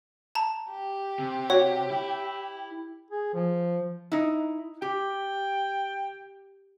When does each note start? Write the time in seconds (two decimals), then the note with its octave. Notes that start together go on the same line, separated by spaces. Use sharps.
0.35 A5 A#5
0.70 G4
1.19 C3
1.50 F#4 C#5
1.90 E4
3.11 G#4
3.34 F3
4.12 D#4 E4
4.82 G4 G5